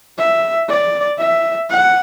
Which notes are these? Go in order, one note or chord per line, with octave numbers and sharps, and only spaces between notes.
E5
D5
E5
F#5